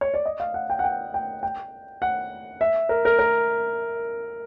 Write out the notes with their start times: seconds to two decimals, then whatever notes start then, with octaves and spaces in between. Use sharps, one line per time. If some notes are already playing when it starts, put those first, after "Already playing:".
0.01 C#5
0.14 D5
0.26 D#5
0.40 F5
0.54 F#5
0.70 G5
0.79 F#5
0.84 G5
1.14 G5
1.43 G5
2.02 F#5
2.61 E5
2.89 A#4
3.05 A#4
3.19 A#4